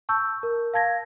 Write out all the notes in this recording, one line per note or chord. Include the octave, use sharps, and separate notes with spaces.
A5 C#6 E6 G6
A#4
F5 A5 G#6 A#6